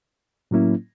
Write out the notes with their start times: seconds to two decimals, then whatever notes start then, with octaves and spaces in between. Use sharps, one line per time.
0.51 A2 F#3 A#3 C#4 E4